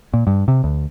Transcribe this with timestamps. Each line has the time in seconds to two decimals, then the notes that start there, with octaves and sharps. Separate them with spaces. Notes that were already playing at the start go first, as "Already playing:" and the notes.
0.14 A#2
0.27 G2
0.48 C3
0.64 D2